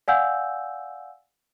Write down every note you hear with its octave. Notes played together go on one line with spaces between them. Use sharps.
D5 F5 F#5 G#5 E6 G6